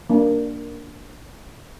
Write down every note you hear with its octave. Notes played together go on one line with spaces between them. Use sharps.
A#3 D4